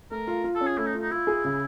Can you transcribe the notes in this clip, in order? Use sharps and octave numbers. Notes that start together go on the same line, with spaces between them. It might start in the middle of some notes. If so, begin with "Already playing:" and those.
A3 A#4
F4
F4
A4
C#4
G#4
A3 E4
D#4
F4
D#4
E4 F4
G#4
C#3